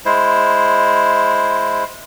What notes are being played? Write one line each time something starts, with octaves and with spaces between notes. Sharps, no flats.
G#3 E4 C5